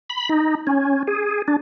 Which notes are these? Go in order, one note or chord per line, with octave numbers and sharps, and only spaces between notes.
B5
D#4
C#4
G#4
D4